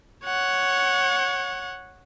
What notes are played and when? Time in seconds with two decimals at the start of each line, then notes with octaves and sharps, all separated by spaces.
0.25 C#5 F#5